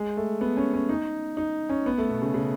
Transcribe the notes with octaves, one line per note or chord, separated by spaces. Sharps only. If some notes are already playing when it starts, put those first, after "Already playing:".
Already playing: G#3
A3
B3
C#4
C#4
D#4
D#4
C#4
B3
A3
B2
C#3
C#3